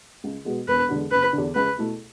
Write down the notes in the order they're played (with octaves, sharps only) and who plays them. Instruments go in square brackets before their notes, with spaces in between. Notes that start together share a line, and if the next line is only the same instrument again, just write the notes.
[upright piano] C#2
B2 G#3 B3 F#4
[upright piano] E1 [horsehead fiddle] B4
[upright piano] E2 D3 G#3 B3
[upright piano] F#1 [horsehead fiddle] B4
[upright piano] E2 D3
[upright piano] C#2 [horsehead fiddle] B4
[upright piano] B2 A3 E4 A4